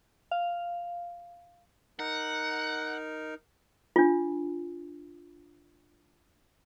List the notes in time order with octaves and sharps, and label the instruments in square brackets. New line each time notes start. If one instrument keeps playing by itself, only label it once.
[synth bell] F5
[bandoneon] D#4 A#4 [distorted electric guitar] F#5
[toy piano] D4 F4